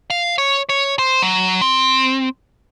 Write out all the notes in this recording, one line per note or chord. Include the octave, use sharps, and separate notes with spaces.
F5
C#5
C#5
C5
F#3
C4